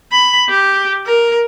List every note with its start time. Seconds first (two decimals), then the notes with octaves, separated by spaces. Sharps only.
0.12 B5
0.49 G4
1.06 A#4